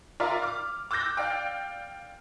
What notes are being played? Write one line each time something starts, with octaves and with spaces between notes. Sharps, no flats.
F4 A#4 D5 E5 F5
D6 F6
D6 E6 F#6 G6 A#6
D5 F5 G5